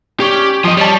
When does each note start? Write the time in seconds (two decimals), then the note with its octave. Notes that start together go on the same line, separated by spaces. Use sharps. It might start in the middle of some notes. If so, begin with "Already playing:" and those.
0.20 C#4 G4 D5
0.64 F3 D#5
0.77 G3 C#5 A5